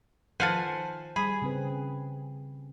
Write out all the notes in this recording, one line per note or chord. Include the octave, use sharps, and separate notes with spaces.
D#3 F3 A4 B4 C5 F5 F#5 G#5
G3 G#4 B5
C#3 C4 B4